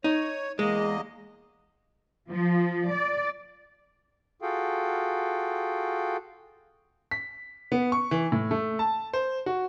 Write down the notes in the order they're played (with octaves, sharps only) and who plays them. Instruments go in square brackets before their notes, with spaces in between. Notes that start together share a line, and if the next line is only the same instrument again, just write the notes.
[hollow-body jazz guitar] D#4 [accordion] C#5
[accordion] E2 A#3 D#5 [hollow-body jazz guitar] G#3
[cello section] F3
D5
[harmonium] F4 F#4 G#4 A4 F5 G5
[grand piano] B6
B3
C#6
E3
A2
A3
A5
C5
F#4